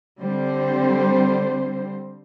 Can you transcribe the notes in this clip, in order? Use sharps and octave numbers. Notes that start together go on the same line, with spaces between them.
D3 G3 C4 C5